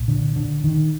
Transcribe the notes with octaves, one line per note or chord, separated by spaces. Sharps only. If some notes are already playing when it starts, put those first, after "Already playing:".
Already playing: C2 A#2
D3
D3
D#3